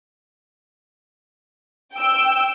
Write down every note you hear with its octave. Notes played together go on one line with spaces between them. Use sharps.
G5 E6